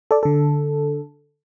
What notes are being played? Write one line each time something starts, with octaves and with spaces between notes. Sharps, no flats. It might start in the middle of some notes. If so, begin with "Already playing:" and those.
A4 D5
D3 A4